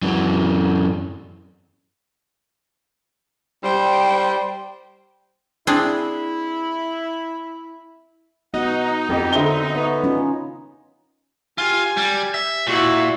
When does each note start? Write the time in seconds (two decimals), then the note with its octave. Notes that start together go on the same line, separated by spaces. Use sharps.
0.02 F#2 E3
3.64 G3 C5 G5
5.67 C4 D4 E4 G#4
8.54 B3 D#4 F#4 F#5
9.09 F2 G4 A#4 D#5
9.32 D3 C4 E5 G7
9.75 B3 C#5
10.04 C#4 D#4 F4
11.58 F4 G4 G#5
11.97 G3
12.34 E5
12.67 A#2 E4 F#4